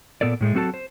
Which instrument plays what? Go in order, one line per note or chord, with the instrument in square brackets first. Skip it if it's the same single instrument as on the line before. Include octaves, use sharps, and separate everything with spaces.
[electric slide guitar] A#2 B3 A4 A#4 D5
A2 G#3 A3
F#3 C4 F#4 A4 A5
C5